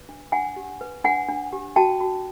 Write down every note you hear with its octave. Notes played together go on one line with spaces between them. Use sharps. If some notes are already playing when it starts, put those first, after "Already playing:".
Already playing: B4
D4
D4 F#5 G#5
G4
B4
D4 F#5 G#5
D4
G4
F#4 G5 A5
F#4